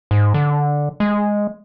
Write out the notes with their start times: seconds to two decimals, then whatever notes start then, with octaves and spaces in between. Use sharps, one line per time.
0.11 G#2
0.34 D3
1.00 G#3